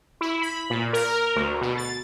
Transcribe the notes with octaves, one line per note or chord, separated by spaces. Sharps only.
E4
B5
A#2
A#4
D2
B2
A6